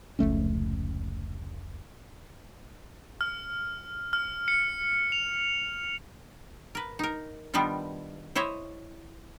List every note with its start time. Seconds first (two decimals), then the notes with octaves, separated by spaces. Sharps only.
0.19 F1 C#2 A3 C#4
3.21 F6
4.13 F6
4.48 C#7
5.12 F7
6.75 A#4 B4
6.99 D#4 A#4
7.54 D#3 G3 B3 D4 D#4 F4
8.35 E4 C5 C#5 D#5 E5